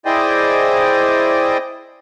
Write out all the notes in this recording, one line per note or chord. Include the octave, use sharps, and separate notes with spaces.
E4 G#4 C5 D5 D#5 G5